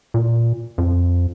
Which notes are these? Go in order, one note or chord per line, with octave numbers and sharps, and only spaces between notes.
A#2
F2